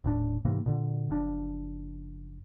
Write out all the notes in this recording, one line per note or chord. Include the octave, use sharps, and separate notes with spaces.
D#1 A2 D4
G#2 C3 E3 A#3
A#2 D3
F#1 F3 D4